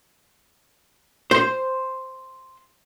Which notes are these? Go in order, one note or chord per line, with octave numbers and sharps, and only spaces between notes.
C5